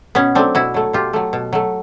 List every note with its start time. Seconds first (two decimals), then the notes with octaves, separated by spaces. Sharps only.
0.15 B2 B3 C#4
0.35 F#3 A3 C4 D4
0.55 B2 E4 F#4
0.74 F#3 A3
0.93 B2 F4 G4
1.13 F#3 A3
1.33 B2
1.53 F#3 A3